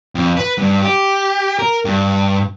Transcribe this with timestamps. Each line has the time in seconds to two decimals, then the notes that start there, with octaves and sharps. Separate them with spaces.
0.15 F2
0.37 B4
0.58 G2
0.82 G4
1.59 A#4
1.85 G2